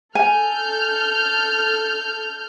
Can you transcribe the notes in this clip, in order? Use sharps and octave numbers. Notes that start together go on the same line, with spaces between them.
A4 G#5 F6 G6